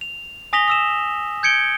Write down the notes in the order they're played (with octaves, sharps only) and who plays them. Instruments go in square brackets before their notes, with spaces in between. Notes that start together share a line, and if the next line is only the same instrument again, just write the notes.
[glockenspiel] F7
G#5 D#6 A#6 B6 F7 G7
D#6 E6 E7
G6 G#6 C#7 D7 G7